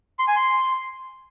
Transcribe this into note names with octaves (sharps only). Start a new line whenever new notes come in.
C6
G#5
C6